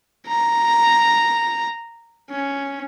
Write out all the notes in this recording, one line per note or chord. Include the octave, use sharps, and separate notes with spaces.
A#5
C#4